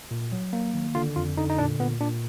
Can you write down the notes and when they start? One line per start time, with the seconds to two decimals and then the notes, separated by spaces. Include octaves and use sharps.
0.11 A#2
0.32 F#3
0.53 A#3
0.74 D#3
0.95 D3 F4
1.16 F2 F4
1.37 D3 D#4
1.49 D#4
1.58 A#2 D4
1.80 A#2 B3
2.00 A#2 D4